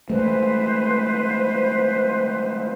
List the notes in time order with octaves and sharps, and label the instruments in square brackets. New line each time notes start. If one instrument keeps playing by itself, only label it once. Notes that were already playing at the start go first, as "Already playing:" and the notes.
[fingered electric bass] E3 G#3 A3 [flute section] B4 C5